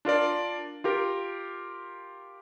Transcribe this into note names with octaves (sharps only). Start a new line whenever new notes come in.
D4 F4 A#4 D5
F4 G4 A#4